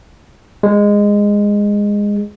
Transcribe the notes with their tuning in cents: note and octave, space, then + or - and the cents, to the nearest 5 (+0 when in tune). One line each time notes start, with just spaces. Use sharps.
G#3 -15